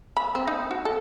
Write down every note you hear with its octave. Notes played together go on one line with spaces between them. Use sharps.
B5
C4
D#4
F#4
A4